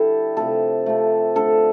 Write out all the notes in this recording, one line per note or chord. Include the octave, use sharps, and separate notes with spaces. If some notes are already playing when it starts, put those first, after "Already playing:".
Already playing: D3 G3 E4 G4 A4
C3 F3 A3 A4
C3 F3 A3
D3 A3 A4